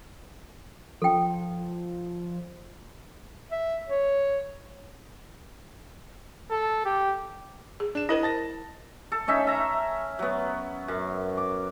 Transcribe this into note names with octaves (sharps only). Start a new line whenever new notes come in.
F3 A4 G5
E5
C#5
A4
G4
G#4
D4 E7
E4 A#4 C5 D#5 D#6
A5 A6 A#6
A4
C#4 D#4 E5
E5 A#5
F#3 B3
F#2
D6